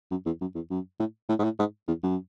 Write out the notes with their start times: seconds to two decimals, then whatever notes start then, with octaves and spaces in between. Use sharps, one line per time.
0.11 F#2
0.26 E2
0.41 F#2
0.55 E2
0.70 F#2
0.99 A2
1.29 A2
1.39 G#2
1.44 A2
1.59 G#2
1.88 E2
2.03 F#2